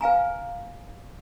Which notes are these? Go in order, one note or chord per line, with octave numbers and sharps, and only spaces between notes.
B4 F5 G#5 A#5